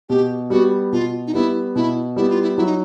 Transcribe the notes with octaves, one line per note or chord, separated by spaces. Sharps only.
B2 G4
G3 B3 F#4
B2 F4
D#4
G3 B3 E4
B2 E4
G3 B3 E4
F4
E4
F#3 E4
D#4